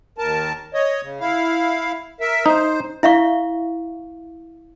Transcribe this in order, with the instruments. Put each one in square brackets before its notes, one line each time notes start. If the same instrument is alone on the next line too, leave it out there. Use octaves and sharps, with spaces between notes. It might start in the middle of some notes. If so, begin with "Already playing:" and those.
[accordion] D#2 A#4 A5
C#5 D#5
C#3
E4 F5
A#4 E5
[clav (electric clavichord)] D#4 [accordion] C5
[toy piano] E4 E5 F5 C#6